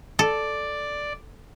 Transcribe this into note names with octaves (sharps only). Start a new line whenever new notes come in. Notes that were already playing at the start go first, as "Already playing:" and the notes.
A4 D5